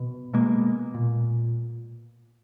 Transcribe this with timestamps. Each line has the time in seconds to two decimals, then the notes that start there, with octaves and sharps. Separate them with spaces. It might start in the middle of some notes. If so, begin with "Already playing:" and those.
Already playing: B2
0.34 B2 G#3 A#3
0.94 A#2